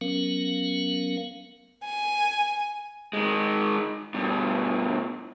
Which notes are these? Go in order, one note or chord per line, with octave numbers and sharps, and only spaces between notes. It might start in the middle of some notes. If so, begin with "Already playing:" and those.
F#3 B3 C#4 A#4 F5
G#5
D#3 G#3
G2 B2